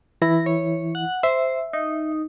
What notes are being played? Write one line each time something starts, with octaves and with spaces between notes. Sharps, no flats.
E3 E4 A#6
C#5
F#5
C5 E5
D#4